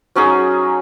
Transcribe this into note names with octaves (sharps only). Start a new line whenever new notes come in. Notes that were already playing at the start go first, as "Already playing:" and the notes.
F#3 C#4 D#4 G#4